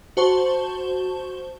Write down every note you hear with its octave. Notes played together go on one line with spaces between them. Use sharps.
F#4 C5 A5 C#6 G7